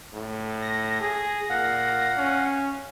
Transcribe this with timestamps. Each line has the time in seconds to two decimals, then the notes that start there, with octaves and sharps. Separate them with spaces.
0.13 A2
0.62 A#6
1.01 G#4
1.50 A#2 F5 F#5
2.17 C#4